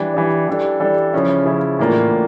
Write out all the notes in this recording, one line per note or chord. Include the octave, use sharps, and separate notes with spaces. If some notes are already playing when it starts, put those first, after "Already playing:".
Already playing: E3 G3 D4
E3 G3 D4
E3 G3 D4 A4
E3 G3 D4 A4
C#3 F3 C#4 E4
C#3 F3 C#4 E4
A2 E3 A#3 D4 F4
A2